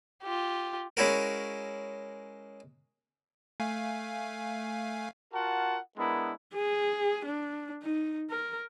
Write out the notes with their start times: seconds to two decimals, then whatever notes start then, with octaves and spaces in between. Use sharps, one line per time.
0.23 F4 G4
0.97 G#3 C#4 E4 F#4 A#4
3.60 A3 F5 G#5
5.33 F4 F#4 A#4 F#5 A5
5.97 G#3 B3 D4 E4 A#4
6.54 G#4
7.25 D4
7.83 D#4
8.30 A#4